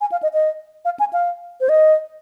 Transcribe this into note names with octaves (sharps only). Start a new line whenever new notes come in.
G#5
F5
D#5
D#5
F5
G#5
F5
C5
D#5